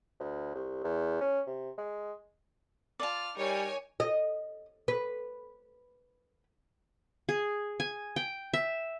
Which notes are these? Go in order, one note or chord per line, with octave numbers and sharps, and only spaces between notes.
D2
C2
E2
C#4
C3
G#3
F4 D5 A5 F6
G3 D#4 A#4 C#5 G#5
D#5
B4
G#4
G#5
G5
E5